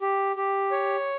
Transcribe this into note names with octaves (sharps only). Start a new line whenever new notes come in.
G4
G4
C#5